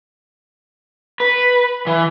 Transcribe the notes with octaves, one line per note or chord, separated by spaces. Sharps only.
B4
E3